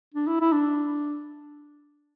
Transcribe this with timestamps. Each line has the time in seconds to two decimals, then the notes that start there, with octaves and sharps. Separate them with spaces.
0.14 D4
0.27 E4
0.41 E4
0.53 D4